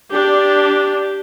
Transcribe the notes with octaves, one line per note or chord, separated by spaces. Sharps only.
D4 G4